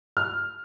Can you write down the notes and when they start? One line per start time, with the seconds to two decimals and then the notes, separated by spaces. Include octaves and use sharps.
0.17 F6